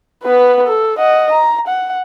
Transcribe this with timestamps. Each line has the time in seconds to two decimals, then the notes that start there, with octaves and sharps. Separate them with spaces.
0.23 B3 B4
0.67 A4
0.98 D#5 F#5
1.32 A#5
1.67 F#5